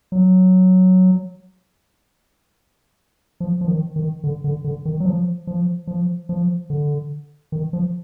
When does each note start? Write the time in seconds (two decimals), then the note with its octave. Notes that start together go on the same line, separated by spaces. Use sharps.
0.12 F#3
3.40 F3
3.61 F3
3.68 D#3
3.96 D#3
4.24 D3
4.44 D3
4.64 D3
4.85 D#3
5.00 F#3
5.05 F3
5.47 F3
5.87 F3
6.29 F3
6.70 D3
7.52 D#3
7.73 F3